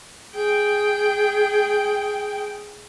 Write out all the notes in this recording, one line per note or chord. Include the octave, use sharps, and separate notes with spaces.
G#4 G5